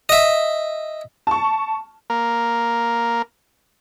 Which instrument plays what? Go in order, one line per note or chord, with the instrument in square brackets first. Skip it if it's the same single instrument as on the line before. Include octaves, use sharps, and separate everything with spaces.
[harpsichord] D#5 E5
[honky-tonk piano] A5 C#6
[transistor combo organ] A#3 A#4